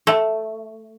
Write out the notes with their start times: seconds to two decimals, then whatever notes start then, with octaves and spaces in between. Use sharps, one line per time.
0.07 A3